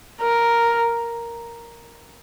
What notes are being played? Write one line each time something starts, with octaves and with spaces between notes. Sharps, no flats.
A#4